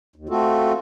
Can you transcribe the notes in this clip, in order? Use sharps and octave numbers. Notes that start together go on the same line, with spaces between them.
D#2
A3 C4 F4 F#4 A4